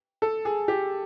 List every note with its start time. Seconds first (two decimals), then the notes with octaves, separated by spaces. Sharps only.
0.22 A4
0.45 G#4
0.68 G4